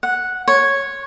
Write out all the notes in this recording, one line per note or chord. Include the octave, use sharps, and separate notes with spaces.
F#5
C#5